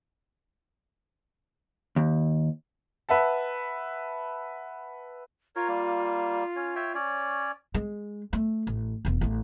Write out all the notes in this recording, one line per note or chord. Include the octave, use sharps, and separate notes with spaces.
D#2
B4 E5 F#5 A5
F4 A#4 C#5
G3 A#3
C#4 C#5
C#5 E5 G5
C#4 C#5 D5
G#3
A3
A1
E1 A#3
A1 A#3